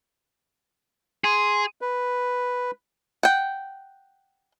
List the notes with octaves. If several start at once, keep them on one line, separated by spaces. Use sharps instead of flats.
G#4 C6
B4
F#5 G5